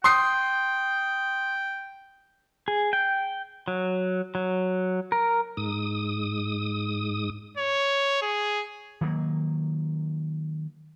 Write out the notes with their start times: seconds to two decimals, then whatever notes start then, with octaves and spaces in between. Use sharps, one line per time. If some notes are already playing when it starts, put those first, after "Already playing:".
0.04 G5 C6 D#6 C7
2.68 G#4
2.93 G5
3.68 F#3
4.35 F#3
5.12 A#4
5.57 G#2 D#6
7.57 C#5
8.22 G#4
9.01 D#3 F#3 A#3